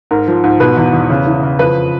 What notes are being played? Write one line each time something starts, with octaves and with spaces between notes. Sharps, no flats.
G#2 A#4
F3
G#2
B2 B4
E2
E2
C#3
E3
C#3
F2 B4